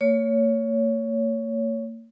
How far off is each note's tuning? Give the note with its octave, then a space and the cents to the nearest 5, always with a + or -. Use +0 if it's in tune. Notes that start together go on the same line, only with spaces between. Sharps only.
A#3 -40 C#5 +15